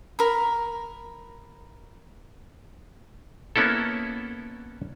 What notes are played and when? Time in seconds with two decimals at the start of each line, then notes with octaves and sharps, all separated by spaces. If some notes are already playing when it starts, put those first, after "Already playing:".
0.19 A#4 B5
3.56 A#3 B3 C#4 E4 A4